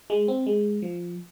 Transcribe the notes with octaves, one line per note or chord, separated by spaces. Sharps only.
G#3
C4
G#3
F3